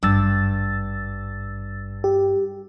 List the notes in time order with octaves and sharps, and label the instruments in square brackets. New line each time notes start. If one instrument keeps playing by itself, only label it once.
[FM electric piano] G#1 E6 A6 [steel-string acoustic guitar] G2
[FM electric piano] G4